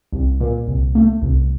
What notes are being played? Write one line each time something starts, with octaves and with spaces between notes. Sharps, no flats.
C2
A#2
C2
A3
C2